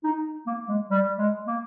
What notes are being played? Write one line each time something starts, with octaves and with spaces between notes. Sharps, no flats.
D#4
A#3
G#3
G3
G#3
A#3